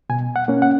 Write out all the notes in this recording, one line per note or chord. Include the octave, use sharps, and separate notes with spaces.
B2 G#5
F#5
A#3 C#4
F#5